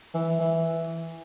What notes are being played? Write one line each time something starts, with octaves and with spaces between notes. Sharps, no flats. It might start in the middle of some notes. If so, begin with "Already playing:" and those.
E3
E3